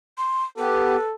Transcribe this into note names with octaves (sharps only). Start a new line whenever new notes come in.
C6
B3 G4 A4 B4